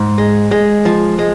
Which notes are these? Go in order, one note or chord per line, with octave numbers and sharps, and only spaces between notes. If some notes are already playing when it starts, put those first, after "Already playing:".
Already playing: G#2
G#3
G#3
F3
G#3